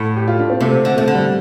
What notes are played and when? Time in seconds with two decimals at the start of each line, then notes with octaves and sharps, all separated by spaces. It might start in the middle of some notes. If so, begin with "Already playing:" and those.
Already playing: A2
0.17 G4
0.28 F4
0.39 D4
0.50 C4
0.61 C3 A3
0.85 D3
0.96 F3 A3
1.08 D3
1.14 G3